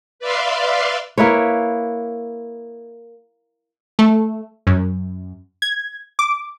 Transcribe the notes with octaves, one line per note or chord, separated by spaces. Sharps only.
B4 D5 E5 F5 C6
A#3 E4 B4 C#5
A3
F#2
G#6
D6